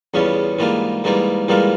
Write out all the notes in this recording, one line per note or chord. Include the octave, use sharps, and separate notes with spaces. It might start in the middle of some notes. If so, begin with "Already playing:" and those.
E2 C#3 G3 C#4 F4
G#2 E3 G3 A#3 F4
G#2 E3 G3 A#3 F4
G#2 E3 G3 A#3 F4